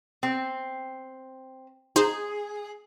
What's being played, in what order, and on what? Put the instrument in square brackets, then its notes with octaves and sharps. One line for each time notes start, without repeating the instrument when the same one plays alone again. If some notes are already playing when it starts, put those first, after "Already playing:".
[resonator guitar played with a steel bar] C4
[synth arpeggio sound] D#4 C5 [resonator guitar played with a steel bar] G#4